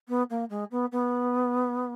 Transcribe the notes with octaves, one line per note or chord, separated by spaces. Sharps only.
B3
A#3
G#3
B3
B3